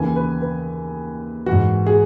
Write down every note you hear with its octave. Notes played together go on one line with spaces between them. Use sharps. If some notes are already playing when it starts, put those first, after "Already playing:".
Already playing: D#2 C#3 E3 G#5
B4
B4
E3 F#4
G#2
G#4